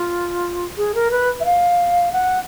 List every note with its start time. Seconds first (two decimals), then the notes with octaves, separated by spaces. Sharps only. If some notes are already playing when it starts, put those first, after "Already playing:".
Already playing: F4
0.77 G#4
0.95 A#4
1.11 B4
1.40 E5
1.45 F5
2.13 F#5